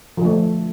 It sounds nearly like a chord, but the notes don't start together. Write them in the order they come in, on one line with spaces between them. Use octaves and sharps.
F3 D3 A3